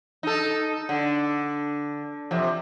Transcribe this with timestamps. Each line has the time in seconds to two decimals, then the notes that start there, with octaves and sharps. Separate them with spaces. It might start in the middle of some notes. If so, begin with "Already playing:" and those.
0.23 D#4 A4
0.89 D3
2.31 F2 C3